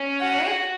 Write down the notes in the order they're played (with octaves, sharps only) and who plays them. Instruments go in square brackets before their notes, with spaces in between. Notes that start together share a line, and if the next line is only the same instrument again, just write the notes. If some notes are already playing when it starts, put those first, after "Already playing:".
Already playing: [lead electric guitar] C#4
[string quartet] F#4 F#5
[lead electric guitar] G#4
F#4